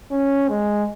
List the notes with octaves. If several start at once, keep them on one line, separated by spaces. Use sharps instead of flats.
C#4
G#3